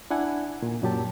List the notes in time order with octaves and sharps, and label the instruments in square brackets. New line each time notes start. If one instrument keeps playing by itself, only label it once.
[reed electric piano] D4 E4 F#5 G#5
A#2
F#2 A#2 F#3 G4 A5